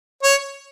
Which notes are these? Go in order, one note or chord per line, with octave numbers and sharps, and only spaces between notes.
C#5